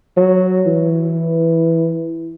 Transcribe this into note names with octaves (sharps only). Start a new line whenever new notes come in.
F#3
E3